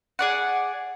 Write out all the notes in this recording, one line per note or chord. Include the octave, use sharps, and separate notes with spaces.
G#4 D5 F#5